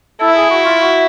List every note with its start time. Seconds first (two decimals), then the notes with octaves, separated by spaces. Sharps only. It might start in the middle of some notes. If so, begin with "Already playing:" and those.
0.20 E4 A4
0.36 G#4
0.50 F#4
0.65 F4
0.81 F#4